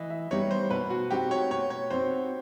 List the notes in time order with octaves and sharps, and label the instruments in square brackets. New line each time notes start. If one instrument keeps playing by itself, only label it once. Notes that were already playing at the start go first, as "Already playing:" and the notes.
Already playing: [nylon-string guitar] E3 [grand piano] D#5 E5
[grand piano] E5
[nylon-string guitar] G3 B3 D#4 G4 [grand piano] C#5
[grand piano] C5
[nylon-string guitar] B2 [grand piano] B4
[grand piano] F#4
[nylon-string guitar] G#3 C4 D#4 F#4 [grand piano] G4
[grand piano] C#5
[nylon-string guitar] B2 [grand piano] C#5
[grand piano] C#5
[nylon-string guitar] C4 D#4 F#4 [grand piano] C5